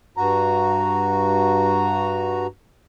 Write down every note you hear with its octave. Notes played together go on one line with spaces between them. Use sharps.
G2 F#4 A#5